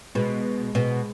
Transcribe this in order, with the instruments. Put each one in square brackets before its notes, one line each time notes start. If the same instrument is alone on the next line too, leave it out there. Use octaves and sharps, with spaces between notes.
[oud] B2 [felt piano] G#3
[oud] B2 [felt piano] G#3